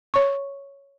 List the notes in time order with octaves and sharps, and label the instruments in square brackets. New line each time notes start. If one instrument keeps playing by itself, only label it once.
[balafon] C#5 C#6